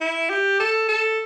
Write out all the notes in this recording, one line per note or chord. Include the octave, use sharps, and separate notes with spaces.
E4
G4
A4
A4